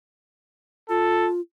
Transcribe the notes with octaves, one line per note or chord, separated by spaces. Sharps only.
F4 A4